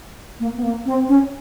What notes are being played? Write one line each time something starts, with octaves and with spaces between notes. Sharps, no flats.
A#3
B3
A#3
C4
C#4